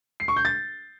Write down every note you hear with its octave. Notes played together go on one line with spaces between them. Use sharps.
C7
C#6
G6
A6